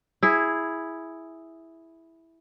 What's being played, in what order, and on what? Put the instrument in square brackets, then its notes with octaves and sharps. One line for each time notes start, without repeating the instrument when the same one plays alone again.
[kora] E4 G#4